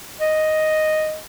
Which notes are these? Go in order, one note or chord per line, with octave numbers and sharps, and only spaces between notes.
D#5